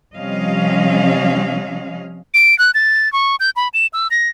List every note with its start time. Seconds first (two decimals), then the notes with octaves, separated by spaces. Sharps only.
0.16 C3 F3 G3 C#4 D#5 F5
2.34 D7
2.59 F#6
2.74 A6
3.13 C#6
3.40 G6
3.56 B5
3.74 E7
3.93 E6
4.11 A#6